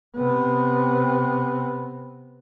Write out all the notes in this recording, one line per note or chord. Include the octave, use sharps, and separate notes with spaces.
C3 B3